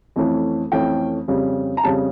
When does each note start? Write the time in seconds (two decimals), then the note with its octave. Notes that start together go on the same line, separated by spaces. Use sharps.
0.16 F2 E3 A3 C#4
0.72 F2 E3 A3 C#4 G5
1.28 F2 C#3 G3
1.77 A#5
1.84 F2 C#3 G3 A5